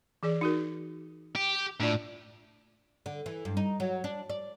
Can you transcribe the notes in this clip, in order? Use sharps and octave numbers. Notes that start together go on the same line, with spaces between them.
E3 G#4 D5
D#4 F#4 A#4
G4
A2 D4 F4 D5
D3
E3
G2
D#4
F#3
D4
D5